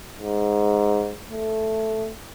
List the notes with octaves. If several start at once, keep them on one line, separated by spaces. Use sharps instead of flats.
G#2
A3